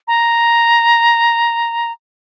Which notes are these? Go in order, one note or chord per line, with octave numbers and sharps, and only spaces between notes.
A#5